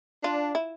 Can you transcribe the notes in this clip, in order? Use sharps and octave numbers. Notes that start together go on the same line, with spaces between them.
D4 F4
E4